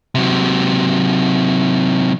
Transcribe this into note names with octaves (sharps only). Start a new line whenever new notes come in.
C3 F#3